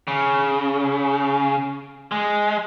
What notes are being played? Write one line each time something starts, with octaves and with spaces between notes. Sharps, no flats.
C#3
G#3